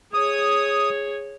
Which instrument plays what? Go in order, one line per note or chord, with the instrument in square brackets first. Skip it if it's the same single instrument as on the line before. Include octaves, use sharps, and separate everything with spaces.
[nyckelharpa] G#4 C#5 [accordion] D#6